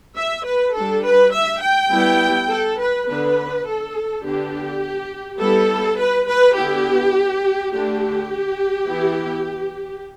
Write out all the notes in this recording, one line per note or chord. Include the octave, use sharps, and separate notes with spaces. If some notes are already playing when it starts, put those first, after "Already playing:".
E5
B4
G3 D4 A4
B4
E5
G5
G3 B3 E4
A4
B4
D3 B3 D4 B4
A4
D3 B3 D4 G4
G3 B3 E4 A4
B4
B4
D3 B3 E4 G4
D3 A3 D4 G4
E3 B3 E4